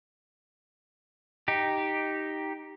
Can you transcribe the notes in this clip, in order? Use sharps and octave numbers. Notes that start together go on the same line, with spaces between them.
D#4 G4